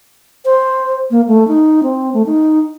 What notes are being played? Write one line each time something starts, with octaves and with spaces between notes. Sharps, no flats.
C5
A#3
A3
D#4
C4
A3
D#4